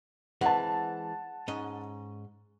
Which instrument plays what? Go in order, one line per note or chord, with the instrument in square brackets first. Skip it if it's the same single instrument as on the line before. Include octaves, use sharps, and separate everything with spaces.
[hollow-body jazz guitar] E3 G#3 C4 [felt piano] F#5 A5
[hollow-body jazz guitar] G#2 C#4 D#5